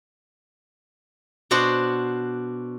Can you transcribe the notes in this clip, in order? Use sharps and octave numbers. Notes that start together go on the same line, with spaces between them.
B2 D4 F#4 C5